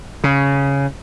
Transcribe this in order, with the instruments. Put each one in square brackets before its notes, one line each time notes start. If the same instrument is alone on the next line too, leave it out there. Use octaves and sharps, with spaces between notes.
[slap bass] C#3